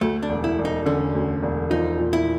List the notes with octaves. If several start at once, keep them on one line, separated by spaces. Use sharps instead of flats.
D2 A3
D4
E1
E4
E1
D#4
D3 C#4
D2
E1
F3 D#4
A#2
E4